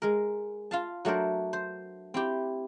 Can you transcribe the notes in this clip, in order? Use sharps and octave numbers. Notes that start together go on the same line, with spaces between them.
G#3 A#4
F4 F5 A5
F#3 A3 D4 A#4 C5
C5
C4 E4 G4